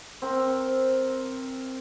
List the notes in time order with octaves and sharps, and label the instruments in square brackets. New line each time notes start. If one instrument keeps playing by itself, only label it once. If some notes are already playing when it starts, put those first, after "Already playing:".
[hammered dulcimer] C4 A#4